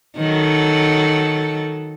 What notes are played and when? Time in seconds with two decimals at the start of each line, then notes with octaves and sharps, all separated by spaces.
0.16 D#3 F#3 A4